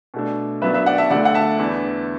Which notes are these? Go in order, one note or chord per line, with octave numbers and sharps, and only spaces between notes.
B2 A3 D4
F#2 F#3 B3 D4 B4 E5
B4 E5
D5 F#5
E5 A5
D2 D3 A3 D5 F#5
F#5
E5 A5
E2 E3 B3 D4